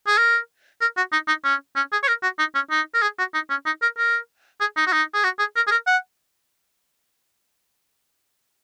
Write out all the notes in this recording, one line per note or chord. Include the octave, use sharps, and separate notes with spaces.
G#4
A#4
A#4
F#4
D#4
D#4
C#4
C#4
G#4
C#5
A#4
F#4
D#4
C#4
D#4
A#4
G#4
F#4
D#4
C#4
D#4
A#4
A#4
G#4
D#4
F#4
D#4
G#4
F#4
G#4
A#4
G#4
A#4
F#5